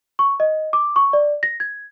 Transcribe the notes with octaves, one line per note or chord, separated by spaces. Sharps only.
C#6
D#5
D6
C#6
D5
A#6
G#6